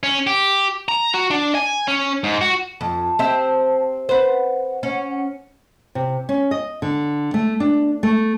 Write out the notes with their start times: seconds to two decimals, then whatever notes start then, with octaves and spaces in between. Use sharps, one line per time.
0.03 C#4
0.27 G4
0.88 A#5
1.14 F#4
1.31 D4
1.55 G#5
1.88 C#4
2.24 G#2
2.41 F#4
2.81 F2 A5
3.19 C4 G4 E5
4.09 B4 C5 F#5
4.83 C#4
5.95 C3
6.29 C#4
6.51 D#5
6.82 D3
7.34 A3
7.60 D4
8.03 A3